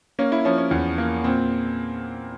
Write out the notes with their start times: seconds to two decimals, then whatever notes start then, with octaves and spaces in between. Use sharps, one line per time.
0.19 A#3 C#4
0.32 E4
0.45 F3 C#4
0.58 C#4
0.71 E2
0.98 A#3
1.24 A#2 C4